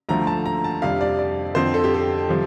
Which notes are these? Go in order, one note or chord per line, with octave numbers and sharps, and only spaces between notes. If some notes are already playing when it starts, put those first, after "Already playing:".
D2 D3 F3 A3 A#5
A5
A#5
A5
F2 C3 G3 D4 F5
D5
D5
F2 D3 F3 C4 C5
A4
G4
A4
C3 F3